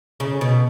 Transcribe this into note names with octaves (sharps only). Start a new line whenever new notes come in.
C#3
B2